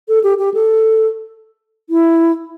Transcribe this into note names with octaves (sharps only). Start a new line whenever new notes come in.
A4
G4
G4
A4
E4